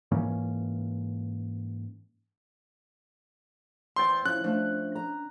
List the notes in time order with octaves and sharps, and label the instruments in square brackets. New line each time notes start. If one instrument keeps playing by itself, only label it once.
[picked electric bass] G#2 E3 A#3 C#4
[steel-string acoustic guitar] E2 C5 G5 [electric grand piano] C6 [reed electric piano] E6 G6 A6
[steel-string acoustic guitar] F3 [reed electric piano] C#4 E4 [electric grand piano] F#6
[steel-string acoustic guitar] F3 A3 [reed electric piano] C#4 D4
[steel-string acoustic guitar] A#5